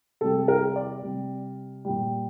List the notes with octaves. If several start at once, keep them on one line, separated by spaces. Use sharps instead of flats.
C3 G3 A4
A#4
D5
C3 G3
A#2 G3